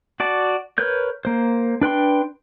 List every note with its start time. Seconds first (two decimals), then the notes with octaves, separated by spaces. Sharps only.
0.20 F#4 D5 A5
0.78 A#4 B4 C#5 G6
1.25 A#3 C5
1.81 D4 B4 G5 C6